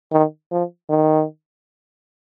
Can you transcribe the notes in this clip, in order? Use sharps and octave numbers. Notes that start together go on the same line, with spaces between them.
D#3
F3
D#3